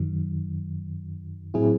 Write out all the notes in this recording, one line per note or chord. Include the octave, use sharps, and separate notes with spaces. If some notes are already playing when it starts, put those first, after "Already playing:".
Already playing: F#2 D#3 F#3
A2 F#3 C4 E4 G#4